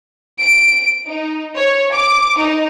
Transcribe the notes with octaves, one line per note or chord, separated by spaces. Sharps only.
D7
D#4
C#5
D6
D#4